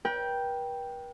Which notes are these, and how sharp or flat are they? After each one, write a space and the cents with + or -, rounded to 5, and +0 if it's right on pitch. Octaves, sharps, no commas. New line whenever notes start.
B4 -45 G5 +0